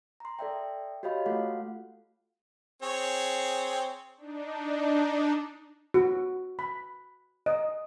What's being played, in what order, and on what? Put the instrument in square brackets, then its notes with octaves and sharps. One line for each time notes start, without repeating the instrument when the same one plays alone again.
[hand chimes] A#5 C6
A4 D5 E5 G5
F#4 G4 C#5 D#5 F5 B5
A3 F4 F#4 A4 F5 F#5
[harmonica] C4 G#4 C#5
[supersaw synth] D4 D#4
[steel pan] F#4
B5
D#5